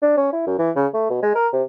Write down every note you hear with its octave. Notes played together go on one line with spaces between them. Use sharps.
D4
C#4
E4
F#2
E3
C#3
A3
B2
G#3
A#4
C3